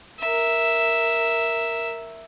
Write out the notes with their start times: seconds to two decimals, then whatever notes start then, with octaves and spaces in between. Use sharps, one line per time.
0.20 A#4 E5